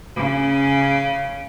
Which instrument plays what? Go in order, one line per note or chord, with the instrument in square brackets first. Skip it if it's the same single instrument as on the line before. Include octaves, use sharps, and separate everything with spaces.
[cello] C#3 C#4